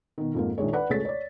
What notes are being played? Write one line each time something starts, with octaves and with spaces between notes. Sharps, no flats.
B2 D#3
F2 G#2 A#3
A#1 D#3 G#3 C#5
B4 D5 F#5 B5
C#2 G#3 A3 C#5 A6 B6
C#5 D5